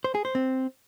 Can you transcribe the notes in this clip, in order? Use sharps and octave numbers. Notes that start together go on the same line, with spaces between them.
C5
G#4
C5
C4